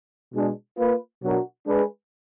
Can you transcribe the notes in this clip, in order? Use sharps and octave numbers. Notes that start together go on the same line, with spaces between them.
B2 G#3 D4
A#3 F4 B4
B2 F#3 D4 F#4 A#4
G#3 D4 G#4 B4